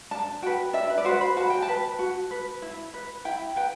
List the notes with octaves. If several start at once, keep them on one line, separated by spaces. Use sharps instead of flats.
D4 A5
F#4 B4 G5
D4 E5
B4
D5
F#4 B4 C5
B5
F#4 A5
G5
A5
B4
F#4
B4
E4
B4
E4 G5
B4 G5